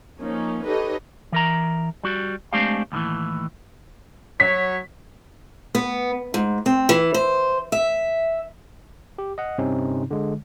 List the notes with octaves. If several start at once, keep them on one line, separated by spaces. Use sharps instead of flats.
F3 A#3 C#4 D#4
D#4 G4 A4 B4 C#5 D#5
E3 A#4 A#5
G3 F#4
G#3 A3 C4 D4 G4 F5
D#2 A2 D#3 E3
F#3 C#5 B6
B3
G#2
C4
E3
C5
E5
G4
D#5 F#5
G2 C3 C4 C#4 D#4
D3 G#3